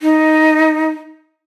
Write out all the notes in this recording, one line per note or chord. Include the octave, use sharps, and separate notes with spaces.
D#4